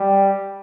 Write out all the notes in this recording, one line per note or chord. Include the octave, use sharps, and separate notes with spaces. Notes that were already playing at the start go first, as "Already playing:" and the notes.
Already playing: G3